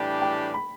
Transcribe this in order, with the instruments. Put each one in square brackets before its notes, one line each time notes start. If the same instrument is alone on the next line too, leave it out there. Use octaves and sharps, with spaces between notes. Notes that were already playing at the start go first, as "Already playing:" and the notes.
Already playing: [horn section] A2 E3 G3 D4 G4 [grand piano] G5
[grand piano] G5
B5